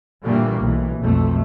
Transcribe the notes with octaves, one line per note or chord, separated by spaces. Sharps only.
A#2 D3 E3 G3 A3 A#3
B1 E3
B1 F2 A3